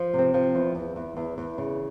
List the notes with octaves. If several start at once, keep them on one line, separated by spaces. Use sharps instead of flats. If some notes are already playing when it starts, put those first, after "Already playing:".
Already playing: F3
C3 C4
F3
E2
E2
E2
E2
E2
C#3